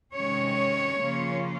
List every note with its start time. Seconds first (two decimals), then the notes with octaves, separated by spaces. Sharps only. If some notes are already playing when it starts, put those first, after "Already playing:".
0.16 C3 D#3 G#3 C#4 C#5
1.02 C#3 F3 A#3 C#4 F4